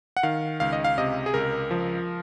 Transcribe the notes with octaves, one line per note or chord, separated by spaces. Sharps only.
F#5
D#3 F5
C#2 F5
D#5
F5
C3 D#5
G#4
C#2 A#4
F3